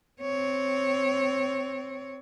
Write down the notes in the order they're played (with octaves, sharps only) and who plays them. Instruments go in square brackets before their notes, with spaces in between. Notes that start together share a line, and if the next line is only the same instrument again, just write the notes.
[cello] C4 C#5